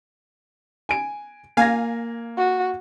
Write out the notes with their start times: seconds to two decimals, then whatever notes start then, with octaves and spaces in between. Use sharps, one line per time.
0.89 G#5 D7
1.57 A#3 F5 G#5 G#6 A#6
2.37 F#4